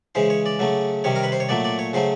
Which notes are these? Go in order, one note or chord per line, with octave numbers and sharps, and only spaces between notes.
C#3 E3 G#3 C5
C#5
D5
C#3 F#3 A3
C3 D#3 G3 C#5
A#4
B4
C5
C#5
A#2 F#3 A3 D5
D5
C#5
C#3 F#3 A3 C5